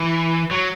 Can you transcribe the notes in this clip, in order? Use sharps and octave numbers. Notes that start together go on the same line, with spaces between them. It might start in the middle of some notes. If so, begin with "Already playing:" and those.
Already playing: E3
F#3